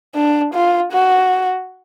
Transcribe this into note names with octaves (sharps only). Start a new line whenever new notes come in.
D4
F4
F#4